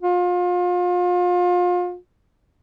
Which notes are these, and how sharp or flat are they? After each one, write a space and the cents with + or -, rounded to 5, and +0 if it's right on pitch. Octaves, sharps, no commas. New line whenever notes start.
F4 +30